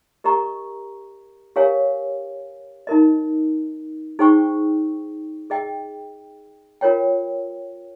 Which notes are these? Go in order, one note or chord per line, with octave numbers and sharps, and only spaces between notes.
G4 A#4 D#5 A#5 C#6
G4 A#4 C#5 F5 G#5
D#4 A#4 D#5
D#4 G#4 C5 G5 C#6
G#4 D#5 G5
F4 A#4 C#5 G5